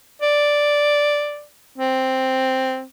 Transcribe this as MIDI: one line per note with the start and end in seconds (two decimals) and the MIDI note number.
0.22 1.44 74
1.78 2.83 60